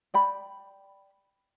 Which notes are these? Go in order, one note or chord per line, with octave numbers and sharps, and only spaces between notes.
D5 G5 B5